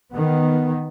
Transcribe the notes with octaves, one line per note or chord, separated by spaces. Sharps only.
D#3 B3